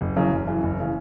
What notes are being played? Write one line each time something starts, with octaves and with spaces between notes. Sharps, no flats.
F#1
F#2 C#3 E3
F#1
F#2 C#3 E3
F#1
C#3 E3